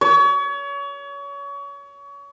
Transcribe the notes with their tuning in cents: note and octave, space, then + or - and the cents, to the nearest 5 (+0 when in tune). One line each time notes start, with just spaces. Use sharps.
C#5 +30